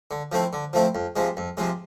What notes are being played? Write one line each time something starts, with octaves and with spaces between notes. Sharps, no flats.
D3
F3 A3 C4 E4
D3
F3 A3 C4 E4
F2
C3 F3 G#3
F2
C3 F3 G#3